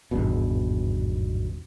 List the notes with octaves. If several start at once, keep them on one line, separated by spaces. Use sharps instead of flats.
G#1 E2 G2 B2